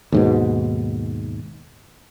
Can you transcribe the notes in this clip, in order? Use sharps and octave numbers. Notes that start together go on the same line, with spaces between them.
D#2 G#2 B2